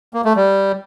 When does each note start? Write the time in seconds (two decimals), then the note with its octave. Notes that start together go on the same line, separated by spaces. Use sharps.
0.14 A#3
0.25 A3
0.36 G3